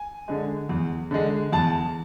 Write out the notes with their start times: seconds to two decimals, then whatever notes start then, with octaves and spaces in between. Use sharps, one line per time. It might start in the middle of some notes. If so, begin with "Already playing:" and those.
Already playing: G#5
0.28 D3 G#3
0.69 E2
1.11 D3 G#3
1.52 E2 A5